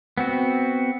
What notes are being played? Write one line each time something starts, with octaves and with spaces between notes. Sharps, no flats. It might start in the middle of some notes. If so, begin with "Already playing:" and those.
B3 C4 F#4